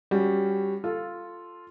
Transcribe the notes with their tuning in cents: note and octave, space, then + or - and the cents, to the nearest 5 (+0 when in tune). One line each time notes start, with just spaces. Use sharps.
G3 +0 C#4 +0 F#4 -5
F4 +0 A4 +0